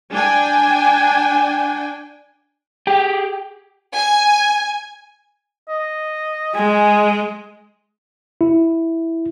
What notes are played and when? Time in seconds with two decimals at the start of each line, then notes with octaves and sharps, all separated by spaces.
0.11 D4 G5 G#5
2.87 G4 G#4 G5
3.97 G#5
5.68 D#5
6.55 G#3 G#5
8.41 E4